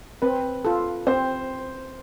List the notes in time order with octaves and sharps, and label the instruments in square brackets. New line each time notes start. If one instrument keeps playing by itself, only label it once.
[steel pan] C4 [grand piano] B4
[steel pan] F4 A4
[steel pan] C4 [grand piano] C5